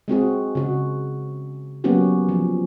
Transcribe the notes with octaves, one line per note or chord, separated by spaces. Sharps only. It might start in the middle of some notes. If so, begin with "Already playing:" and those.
G#3 C4 F#4 G#4
C#3 F#4
F#3 A#3 B3 C#4 F#4 G4
F3